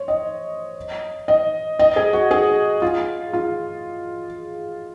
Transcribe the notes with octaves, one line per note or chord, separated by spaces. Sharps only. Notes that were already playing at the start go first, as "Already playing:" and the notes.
Already playing: C5 C#5
D#5
D#5
D#5
G#4
F#4
G#4
F4
F4